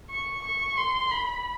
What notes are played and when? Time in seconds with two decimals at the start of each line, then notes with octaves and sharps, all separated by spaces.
0.10 C#6
0.44 C#6
0.77 C6
1.12 B5